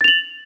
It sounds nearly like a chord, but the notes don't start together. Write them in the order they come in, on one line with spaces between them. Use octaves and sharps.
A6 F7 F#7